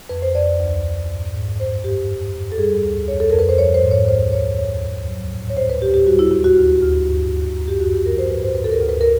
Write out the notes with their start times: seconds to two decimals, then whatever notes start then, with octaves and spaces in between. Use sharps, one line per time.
0.09 F2 B4
0.22 C5
0.35 F2 D5
0.60 D2
0.85 D2
1.10 G#2
1.34 G#2
1.59 G2 C5
1.84 G2 G4
2.09 F2
2.34 F2
2.52 A4
2.58 G3 G#4
2.83 D2
3.08 F2 C#5
3.20 A4
3.30 F2 A#4
3.39 B4
3.49 C5
3.58 F3 C#5
3.74 C5
3.84 G#2
3.91 C#5
4.08 D2 C5
4.32 D2 C#5
4.58 D#2 C#5
4.83 D#2
5.08 F#3
5.33 A2
5.50 C#5
5.56 D2 C5
5.70 B4
5.82 D2 G4
5.94 G4
6.07 G3 F#4
6.19 E4
6.31 D#2 E4
6.44 F#4
6.57 D2
6.82 D2
7.07 G2
7.31 G2
7.56 F#2
7.68 G4
7.80 F#2 F#4
7.94 G4
8.06 F3 A#4
8.18 C5
8.30 G#2 B4
8.43 C5
8.55 D2 B4
8.64 A4
8.71 A#4
8.81 D2
8.89 B4
9.01 A#4